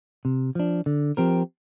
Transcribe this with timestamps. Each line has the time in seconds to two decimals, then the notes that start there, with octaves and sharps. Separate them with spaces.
0.25 C3
0.55 F3 D4
0.86 D3
1.17 F3 C4 G4 A#4